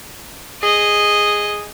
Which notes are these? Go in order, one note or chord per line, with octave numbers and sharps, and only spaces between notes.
G#4 D#5